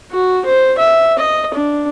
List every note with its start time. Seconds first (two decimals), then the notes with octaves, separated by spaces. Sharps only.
0.12 F#4
0.45 C5
0.78 E5
1.18 D#5
1.54 D4